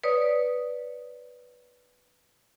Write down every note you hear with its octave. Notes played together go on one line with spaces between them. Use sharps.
B4 C#5 D5 D#6